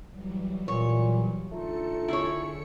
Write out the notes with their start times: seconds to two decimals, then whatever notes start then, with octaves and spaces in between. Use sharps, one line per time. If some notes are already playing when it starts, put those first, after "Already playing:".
0.10 E3 F#3 G3
0.68 A#2 C#5
1.52 D3 A3 D#4 F4 A4 C#7
2.08 E4 G#4 C#5